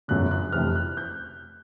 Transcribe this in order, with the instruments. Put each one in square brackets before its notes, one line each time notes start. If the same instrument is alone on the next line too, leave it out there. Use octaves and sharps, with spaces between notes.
[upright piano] G1 F#2 C#3 F#6
F#6
F1 F2 C3 E3 F6
F#6
G6